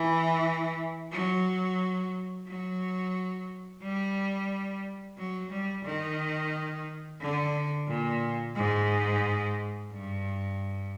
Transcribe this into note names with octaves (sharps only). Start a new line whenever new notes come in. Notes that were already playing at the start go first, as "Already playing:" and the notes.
Already playing: E3
F#3
F#3
G3
F#3
G3
D#3
D3
A#2
G#2
G2